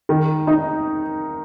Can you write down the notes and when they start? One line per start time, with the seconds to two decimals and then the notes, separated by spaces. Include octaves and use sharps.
0.09 D#3
0.47 D#4